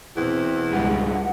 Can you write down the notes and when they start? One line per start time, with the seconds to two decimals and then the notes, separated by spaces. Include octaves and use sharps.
0.17 E2 B2 C4
0.73 C#2 G#2 G3 G#3 F#5